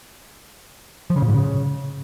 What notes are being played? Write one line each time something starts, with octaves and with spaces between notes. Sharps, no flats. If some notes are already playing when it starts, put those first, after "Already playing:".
F3
C#3
A#2
G#2
C#3